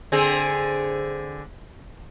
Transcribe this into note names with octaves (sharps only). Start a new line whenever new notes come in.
D3 C4 G#4